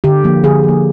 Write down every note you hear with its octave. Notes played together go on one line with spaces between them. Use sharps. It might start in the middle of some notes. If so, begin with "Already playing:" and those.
D3 G4
F3 A#3
D3 G#4
F3 A#3